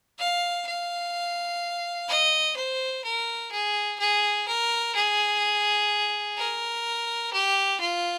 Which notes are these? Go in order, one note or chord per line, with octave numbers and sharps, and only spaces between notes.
F5
F5
D#5
C5
A#4
G#4
G#4
A#4
G#4
A#4
G4
F4